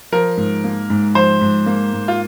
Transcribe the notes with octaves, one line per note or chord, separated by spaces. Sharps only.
F3 A#4
G#2
A#3
G#2
F3 C5
G#2
A#3
G#2
F4